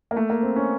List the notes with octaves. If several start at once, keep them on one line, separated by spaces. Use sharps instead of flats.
A#3
A3
A#3
C4
C#4